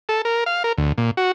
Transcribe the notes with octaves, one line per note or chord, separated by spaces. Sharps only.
A4
A#4
F5
A#4
D2
A#2
F#4